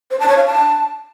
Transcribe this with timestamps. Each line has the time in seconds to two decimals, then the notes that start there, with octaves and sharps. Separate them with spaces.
0.11 C5
0.19 A5
0.28 C#5
0.37 F5
0.45 A5